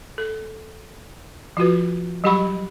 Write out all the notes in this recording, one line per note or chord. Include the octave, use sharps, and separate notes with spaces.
A4
F3 F4 F#4 B4
F#3 G3 G4 F#5 B5 C#6